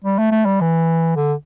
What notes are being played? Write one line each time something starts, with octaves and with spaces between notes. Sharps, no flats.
G3
A3
A3
G3
E3
D3